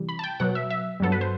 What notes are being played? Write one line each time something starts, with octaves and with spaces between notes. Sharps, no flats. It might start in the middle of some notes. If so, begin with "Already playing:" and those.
Already playing: C3 E3 G3
B5
A5
G5
B2 F#3 B3 F#5
E5
E5
G2 F#3 B3 A4
B4
C5